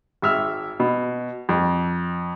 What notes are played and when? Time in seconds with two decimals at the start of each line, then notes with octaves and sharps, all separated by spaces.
0.22 G#1 E5 F6
0.80 B2
1.49 F2